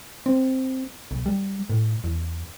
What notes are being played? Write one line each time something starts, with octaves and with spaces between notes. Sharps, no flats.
C4
B1
G3
A2
E2